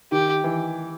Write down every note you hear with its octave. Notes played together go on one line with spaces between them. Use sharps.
D#3 G4
E3